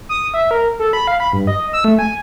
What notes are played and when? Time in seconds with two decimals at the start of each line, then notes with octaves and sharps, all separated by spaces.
0.09 D#6
0.34 E5
0.51 A#4
0.79 A4
0.93 B5
1.08 F5
1.20 B5
1.33 G2
1.47 D#5
1.73 E6
1.84 A3
1.99 G#5